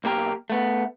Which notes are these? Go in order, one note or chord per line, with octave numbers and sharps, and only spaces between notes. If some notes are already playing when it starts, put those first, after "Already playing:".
B1 A#3 G4 A#4
A3 B3